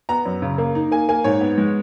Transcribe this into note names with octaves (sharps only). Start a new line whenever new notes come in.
B3 A#5
F#2
C#3
A#3
D#4
A#3 G#5
A#3 G#5
G#2 C#5
B3
G#3